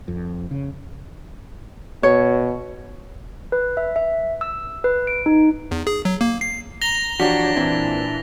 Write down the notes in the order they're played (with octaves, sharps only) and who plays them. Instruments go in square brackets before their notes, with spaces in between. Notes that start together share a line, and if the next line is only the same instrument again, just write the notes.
[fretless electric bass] F2
C#3
[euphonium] B2 [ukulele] C#5
[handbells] B4
E5
E5
E6
B4
D7
D#4
[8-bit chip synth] E2
G#4
F#3
A#3
C7
[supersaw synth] A#5 [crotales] A#6 F7 G7
[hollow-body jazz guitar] E3 F3 F#4 [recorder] D4 [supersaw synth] G4 C#5 A#5 [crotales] B6
[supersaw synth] A#2 E3 [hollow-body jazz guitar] C4 E4 A#4